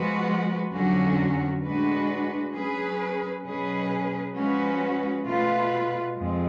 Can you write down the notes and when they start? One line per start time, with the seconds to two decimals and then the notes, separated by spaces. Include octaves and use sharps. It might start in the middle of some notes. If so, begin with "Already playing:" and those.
Already playing: F3 G#3 B3 F#4 B4
0.73 F2 D3 F#3 C#4 F#4
1.63 A2 G#3 D4 F#4 B4
2.54 F#3 C#4 G#4 B4
3.44 B2 F#3 C#4 G#4 B4
4.35 F3 G#3 C#4 F#4 B4
5.25 B2 A3 F4 B4
6.16 F2 F3 G#3